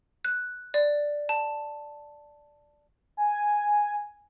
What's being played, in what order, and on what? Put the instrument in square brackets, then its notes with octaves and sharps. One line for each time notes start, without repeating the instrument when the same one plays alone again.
[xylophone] F#6
D5
A5
[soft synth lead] G#5